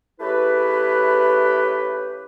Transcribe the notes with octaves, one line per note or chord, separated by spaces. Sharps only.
C#3 A3 E4 G4 B4